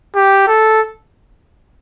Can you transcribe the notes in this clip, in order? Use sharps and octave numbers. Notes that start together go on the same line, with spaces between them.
G4
A4